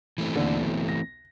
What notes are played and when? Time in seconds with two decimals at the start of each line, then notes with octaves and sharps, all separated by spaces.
0.18 E3 A3 C4
0.36 D#2 D3
0.61 B1
0.89 A#6